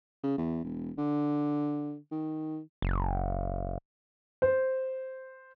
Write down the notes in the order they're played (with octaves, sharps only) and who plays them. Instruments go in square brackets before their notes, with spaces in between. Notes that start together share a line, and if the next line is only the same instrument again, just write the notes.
[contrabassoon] C#3
E2
E1
D3
D#3
[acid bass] F#1
[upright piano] C5